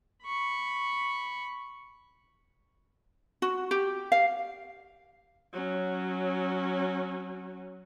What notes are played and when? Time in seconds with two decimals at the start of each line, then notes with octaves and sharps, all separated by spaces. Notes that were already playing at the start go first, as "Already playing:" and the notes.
0.24 B5 C#6
3.42 F#4
3.71 G4
4.12 F5
5.53 F#3 C#4